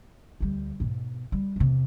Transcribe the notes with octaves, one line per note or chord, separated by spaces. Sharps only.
D2 G3
G#2 B2
G3
E2 C3